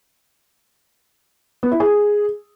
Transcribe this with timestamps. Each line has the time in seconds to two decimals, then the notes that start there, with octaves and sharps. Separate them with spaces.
1.63 B3
1.71 E4
1.80 G#4